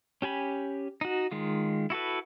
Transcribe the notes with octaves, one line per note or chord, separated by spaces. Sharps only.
C#4 G4 G#5 B5
D#4 F#4
D#3 G#3 F4
E4 F#4 A4 B4